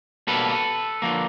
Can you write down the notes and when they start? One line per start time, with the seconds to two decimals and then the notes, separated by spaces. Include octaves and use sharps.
0.27 B2 G3 A#3 A4 B4
1.02 D3 F3 A#3